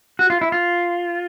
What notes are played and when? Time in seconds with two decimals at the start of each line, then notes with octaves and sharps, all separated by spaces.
0.19 F#4
0.30 F4
0.41 E4
0.52 F4